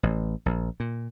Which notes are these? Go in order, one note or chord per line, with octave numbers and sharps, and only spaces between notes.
A1
A#1
A#2